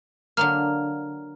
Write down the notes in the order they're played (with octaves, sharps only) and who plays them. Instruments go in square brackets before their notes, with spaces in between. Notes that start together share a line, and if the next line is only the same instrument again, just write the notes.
[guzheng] D3 F#3 A#3 [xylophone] A#5 F6